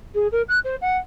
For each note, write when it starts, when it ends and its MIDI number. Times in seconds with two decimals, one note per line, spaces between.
0.15 0.27 68
0.32 0.42 70
0.48 0.59 90
0.64 0.76 72
0.81 0.97 78